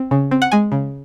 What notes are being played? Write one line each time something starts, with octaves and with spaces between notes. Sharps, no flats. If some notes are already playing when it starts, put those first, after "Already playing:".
Already playing: C4
C#3
C4
F#5
G#3 G#5
C#3